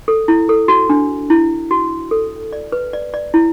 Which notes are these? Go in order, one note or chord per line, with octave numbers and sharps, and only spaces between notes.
A4
E4
A4
F#4
D4
E4
F#4
A4
D5
B4
D5
D5
E4